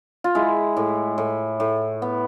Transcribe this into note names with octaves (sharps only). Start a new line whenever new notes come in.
F4
G#3 E4
A2
A2
A2
B3